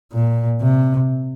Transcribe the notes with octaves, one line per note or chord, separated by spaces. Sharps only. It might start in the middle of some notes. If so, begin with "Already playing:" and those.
A#2
C3